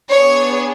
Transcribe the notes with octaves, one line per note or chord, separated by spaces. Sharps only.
B3 D4 G#4 C#5